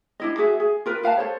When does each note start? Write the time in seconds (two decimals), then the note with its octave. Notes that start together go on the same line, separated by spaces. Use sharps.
0.20 D4 E4 D#5
0.37 F#4 G#4 E5
0.60 G#4
0.86 F4 A#4 B4
1.03 B4 F5 F#5 A5
1.17 A4 C5 C#5